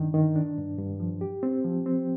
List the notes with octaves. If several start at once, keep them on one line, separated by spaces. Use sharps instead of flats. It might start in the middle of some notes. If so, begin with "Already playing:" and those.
Already playing: G2 D#3 D4
D#3
D4
G2
G2
F3
G4
C4
F3
C4